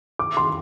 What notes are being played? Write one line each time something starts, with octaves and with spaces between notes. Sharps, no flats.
D6
C6